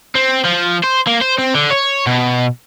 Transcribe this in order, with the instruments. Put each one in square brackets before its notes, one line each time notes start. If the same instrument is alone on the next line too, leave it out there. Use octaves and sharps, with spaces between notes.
[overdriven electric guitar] C4
F3
C5
A#3
C5
C4
D3
C#5
B2